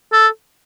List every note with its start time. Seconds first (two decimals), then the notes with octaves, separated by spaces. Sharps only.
0.13 A4